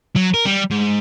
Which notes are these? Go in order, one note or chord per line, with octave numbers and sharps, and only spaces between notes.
F#3
A#4
G3
G#2